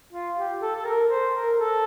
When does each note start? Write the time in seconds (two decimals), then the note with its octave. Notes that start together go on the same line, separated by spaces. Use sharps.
0.13 F4
0.37 G4
0.61 A4
0.76 A4
0.85 A#4
1.09 C5
1.33 A#4
1.58 A4